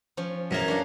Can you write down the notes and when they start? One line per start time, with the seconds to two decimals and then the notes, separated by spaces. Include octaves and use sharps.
0.17 F3 C#4
0.51 F#2 E3 A#3 G#4
0.68 C#4 D4 F5